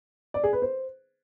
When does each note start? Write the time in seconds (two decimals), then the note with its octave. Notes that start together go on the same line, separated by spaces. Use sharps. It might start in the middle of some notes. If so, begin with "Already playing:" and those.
0.34 D5
0.44 G#4
0.53 B4
0.62 C5